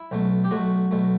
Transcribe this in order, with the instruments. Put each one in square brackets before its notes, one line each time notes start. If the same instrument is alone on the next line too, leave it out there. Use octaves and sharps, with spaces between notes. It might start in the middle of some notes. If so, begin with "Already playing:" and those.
Already playing: [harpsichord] E4
B1 B2 A3
G4
B1 B2 A3 F#4
B1 B2 A3